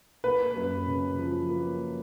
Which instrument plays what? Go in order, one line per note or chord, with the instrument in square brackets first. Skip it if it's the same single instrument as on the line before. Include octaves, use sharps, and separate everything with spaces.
[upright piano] A#3 [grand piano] B4
[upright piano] F#2
C#3
F3
A#3